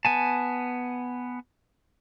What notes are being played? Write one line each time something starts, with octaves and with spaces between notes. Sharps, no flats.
B3 G#5 A5